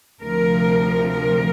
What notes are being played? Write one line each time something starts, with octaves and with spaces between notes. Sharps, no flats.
D2 C3 F3 A#4
A#4